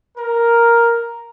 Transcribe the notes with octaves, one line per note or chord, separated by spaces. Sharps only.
A#4